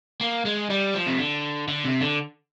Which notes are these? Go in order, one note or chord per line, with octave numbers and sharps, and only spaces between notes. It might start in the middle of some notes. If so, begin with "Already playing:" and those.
A#3
G#3
G3
F3
C3
D3
D3
C3
D3